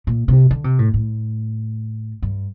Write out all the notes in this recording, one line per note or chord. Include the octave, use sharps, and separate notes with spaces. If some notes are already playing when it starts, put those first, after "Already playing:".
A#2
C3
D3
C3
A2
A2
G2